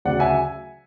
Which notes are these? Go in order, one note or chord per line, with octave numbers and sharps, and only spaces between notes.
D2 C#3 F#3 D5 F#5
E5 G#5